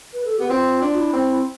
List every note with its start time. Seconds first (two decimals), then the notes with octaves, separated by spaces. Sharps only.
0.14 B4
0.25 A4
0.38 B3 G4
0.49 C4 F4
0.81 D4
0.98 E4
1.13 C4